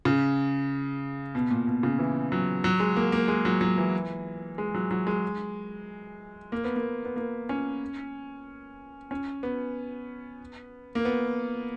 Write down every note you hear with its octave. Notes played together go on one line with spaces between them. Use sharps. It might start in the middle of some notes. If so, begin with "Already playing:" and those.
C#3
B2
A#2
B2
C#3
E3
F#3
F#3
G#3
A#3
A#3
G#3
F#3
F#3
E3
G#3
F#3
F#3
G#3
A#3
B3
A#3
B3
A#3
C#4
C#4
B3
A#3
B3